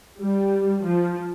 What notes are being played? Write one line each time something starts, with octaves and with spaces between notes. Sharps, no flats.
G3
F3